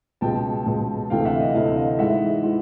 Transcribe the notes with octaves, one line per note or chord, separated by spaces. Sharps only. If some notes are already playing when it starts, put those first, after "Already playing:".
C#2 B2 G#3 G5 A5
C#2 B2 G#3
D2 C3 E3 A3 F5 G5
E5 F#5
D#5 F5
D2 C3 E3 A3 D#5 F5
D#5 F5
G#2 E3 G#3 E5 F#5
E3 G#3